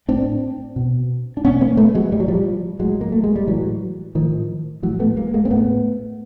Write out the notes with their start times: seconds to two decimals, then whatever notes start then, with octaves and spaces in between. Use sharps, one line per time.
0.08 A2 C4 D4
0.76 B2
1.37 D4
1.44 B2 B3 C#4
1.61 A#3 C4
1.77 A3 B3
1.95 F#3 G#3
2.12 A2 G3
2.20 F#3
2.28 F3 G3
2.79 A2 F#3 G#3
3.01 A#3
3.12 A3
3.24 G#3
3.36 G3
3.47 A2 E3 F#3
4.15 A2 D#3 F3
4.83 A2 E3 F#3
5.00 A3 B3
5.17 G#3 A#3
5.34 G#3 A#3
5.45 C4
5.50 A2 A3 B3